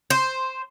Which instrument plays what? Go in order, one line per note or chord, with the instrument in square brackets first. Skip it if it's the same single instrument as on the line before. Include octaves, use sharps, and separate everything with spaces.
[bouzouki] C5